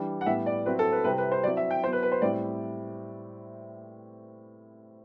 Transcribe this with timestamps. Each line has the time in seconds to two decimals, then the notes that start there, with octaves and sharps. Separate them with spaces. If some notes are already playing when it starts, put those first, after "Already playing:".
Already playing: E3 G3 D4
0.21 F#5
0.26 A2 G3 B3 E4 E5
0.46 D5
0.65 F#3 C4 E4 B4
0.79 A4
0.92 B4
1.04 C3 G3 C4 E4 B4
1.18 B4
1.32 C5
1.43 F#3 C4 E4 D5
1.57 E5
1.71 G5
1.82 F#3 B3 E4 C5
1.93 B4
2.03 B4
2.12 C5
2.22 A2 G3 C4 E4 D5